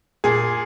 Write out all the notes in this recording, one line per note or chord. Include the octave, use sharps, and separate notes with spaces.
A#2 G#4